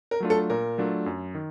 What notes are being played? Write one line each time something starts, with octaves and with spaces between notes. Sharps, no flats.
A#4
F#3 A3 D4 F4
A4
A#2 A#4
F#3 A3 D4 F4
F#2
D#3